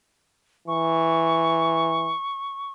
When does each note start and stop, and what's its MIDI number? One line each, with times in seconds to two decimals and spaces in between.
0.68 2.13 52
0.68 2.72 85